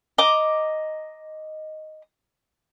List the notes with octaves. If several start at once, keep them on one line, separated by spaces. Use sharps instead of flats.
D#5 A#5 D6